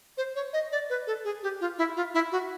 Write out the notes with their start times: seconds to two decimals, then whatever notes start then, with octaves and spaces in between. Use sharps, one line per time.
0.17 C5
0.35 C#5
0.53 D#5
0.72 D5
0.90 B4
1.07 A4
1.25 G#4
1.43 G4
1.61 F4
1.78 E4
1.96 F4
2.14 E4
2.32 F#4